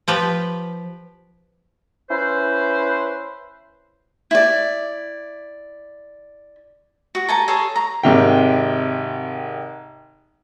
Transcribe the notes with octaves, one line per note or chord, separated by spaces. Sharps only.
F3 G4 B4
C#4 E4 B4 C5
E4 D5
F#4
A4 G#5 A#5
G#4 A4 C#5 G#5
A#5
G#1 C3 G5